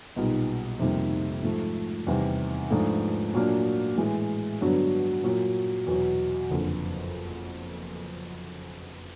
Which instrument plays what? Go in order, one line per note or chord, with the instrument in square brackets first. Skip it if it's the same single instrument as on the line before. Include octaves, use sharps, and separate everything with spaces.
[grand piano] B1 A#2 G3 B3 D#4
F2 C3 D#3 G3 A#3
G#2 F3 A3
E2 C3 D#3 G3
G#2 F3 A3 D4 F4
A#2 F#3 A#3 D4
A2 E3 G#3
G2 D3 F#3 B3 D4
A#2 F#3 A#3
E2 B2 F#3
F#1 F2 D3